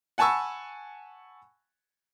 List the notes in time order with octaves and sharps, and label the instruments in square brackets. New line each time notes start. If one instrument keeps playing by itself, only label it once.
[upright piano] F#5 G#5 A5 B5 C#6 E6